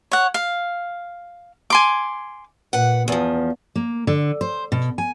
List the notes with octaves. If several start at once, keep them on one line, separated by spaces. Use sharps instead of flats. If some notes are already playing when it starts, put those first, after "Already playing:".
C#5 F#5
F5
G#5 C6 D6
A#2 B4 F#5
E2 F3 B3
A#3
D3
C5
B2
G#5